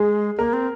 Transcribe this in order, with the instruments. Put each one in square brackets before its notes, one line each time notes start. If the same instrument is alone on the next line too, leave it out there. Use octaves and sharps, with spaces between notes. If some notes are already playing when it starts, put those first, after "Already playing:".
Already playing: [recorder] G#3 [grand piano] G#4
[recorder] A#3 [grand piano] A#4
[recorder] C4